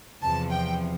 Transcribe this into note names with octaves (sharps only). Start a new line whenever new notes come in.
E2 C3 F3 A5
G5